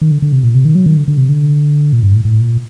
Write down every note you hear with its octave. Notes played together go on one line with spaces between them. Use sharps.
D#3
D3
D3
C3
A#2
C3
D#3
F#3
D#3
D3
D3
C3
D3
A#2
G2
A2
A2
A#2